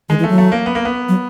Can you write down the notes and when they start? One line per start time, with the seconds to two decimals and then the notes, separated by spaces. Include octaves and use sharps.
0.09 D#3 G#3
0.19 E3
0.24 A3
0.29 F#3
0.38 A3
0.52 A#3
0.66 B3
0.75 A#3
0.85 B3
1.09 F#3